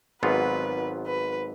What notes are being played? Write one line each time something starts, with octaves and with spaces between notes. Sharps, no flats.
G#1 G#2 F#3 B3 F4 B4
B4